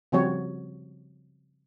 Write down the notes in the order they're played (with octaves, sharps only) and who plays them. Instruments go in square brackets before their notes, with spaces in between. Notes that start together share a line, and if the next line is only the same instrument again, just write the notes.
[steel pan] C#3 F3 G3 C4 F#4 C#5